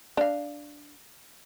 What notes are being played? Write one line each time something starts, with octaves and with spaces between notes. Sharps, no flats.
D4 F5